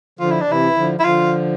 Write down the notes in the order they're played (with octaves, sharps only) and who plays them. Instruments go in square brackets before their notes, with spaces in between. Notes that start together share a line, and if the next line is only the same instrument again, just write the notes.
[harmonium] D3 F3 [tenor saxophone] F4
[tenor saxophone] E4
D4
[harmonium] C3 E3 [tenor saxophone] E4
[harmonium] D3 F3
[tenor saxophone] E4
[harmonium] D3 F3 [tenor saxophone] F4